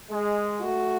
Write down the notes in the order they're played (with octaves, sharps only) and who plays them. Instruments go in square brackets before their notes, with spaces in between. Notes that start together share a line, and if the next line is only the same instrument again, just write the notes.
[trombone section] G#3
[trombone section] A3 [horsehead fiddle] F#4